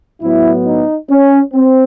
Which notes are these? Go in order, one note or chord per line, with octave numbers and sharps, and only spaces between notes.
A2 F#3 B3 E4
D#4
C#4
C4